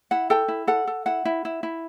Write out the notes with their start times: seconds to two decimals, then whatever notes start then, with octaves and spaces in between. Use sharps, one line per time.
0.11 E4 F#5
0.30 A4 G5
0.48 E4
0.67 A4 F#5
0.87 A4
1.06 E4 F#5
1.25 E4
1.45 E4
1.63 E4